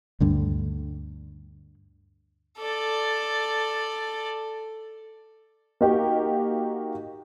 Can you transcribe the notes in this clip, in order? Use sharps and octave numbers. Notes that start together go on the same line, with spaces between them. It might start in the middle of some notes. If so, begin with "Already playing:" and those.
D2 G2 D3
A4 D5
A#3 D#4 F#4 G4